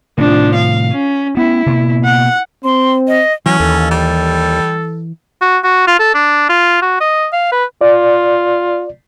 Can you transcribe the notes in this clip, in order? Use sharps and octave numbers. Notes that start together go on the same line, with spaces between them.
A2 C3 D#3 F3 D4
F5
C#4
B3 C#4 E4
B2 A#3
F#5
C4 C6
D#5
E3 F#3 C#4
D#2 A4
G3
F#4
F#4
F4
A4
D4
F4
F#4
D#5
F5
B4
F4 D5